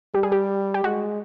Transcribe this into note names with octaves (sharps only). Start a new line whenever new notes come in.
G3 G4
G#4
G4
G4
G#3 F#4